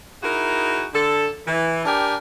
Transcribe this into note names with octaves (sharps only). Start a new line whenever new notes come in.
D#4 E4 F#4 G#4 A#4
D3 A4
E3
D4 G4 A#4 G5 G#5